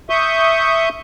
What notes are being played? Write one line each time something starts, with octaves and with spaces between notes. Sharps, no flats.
E5 C#6 D#6 G6